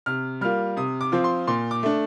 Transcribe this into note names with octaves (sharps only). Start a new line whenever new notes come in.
C3 F6
G3 A#3 F4 F6
C3 D#6
D6
F3 C4 F4
C6
A#2 C6
D6
A3 D4